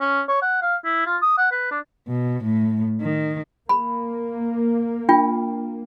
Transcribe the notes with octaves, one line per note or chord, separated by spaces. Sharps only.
C#4
C#5
F#5
F5
E4
F4
D#6
F#5
B4
D4
B2
A2
D#3
A#3 B5
D4 F4 G5